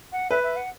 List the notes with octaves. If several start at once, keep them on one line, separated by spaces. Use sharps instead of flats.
F#5
B4 E5
E5
F#5